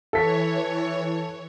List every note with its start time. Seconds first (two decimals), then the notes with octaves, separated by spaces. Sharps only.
0.13 E3 A4 C#5 B6